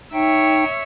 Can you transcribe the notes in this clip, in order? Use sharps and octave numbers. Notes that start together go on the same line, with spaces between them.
D#4 C#5 E5 G5